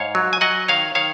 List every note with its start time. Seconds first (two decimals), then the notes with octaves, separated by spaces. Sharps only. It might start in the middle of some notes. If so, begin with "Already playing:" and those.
Already playing: G#2 C#5 F5
0.15 F#3
0.33 G#5
0.41 F#3 D#5 F#5
0.68 D#3 C#5 F5
0.95 D#3 C#5 F5